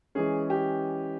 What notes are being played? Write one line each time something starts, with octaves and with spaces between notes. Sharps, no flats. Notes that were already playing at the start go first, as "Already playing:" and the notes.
E3 G#3 C#4 G#4
G4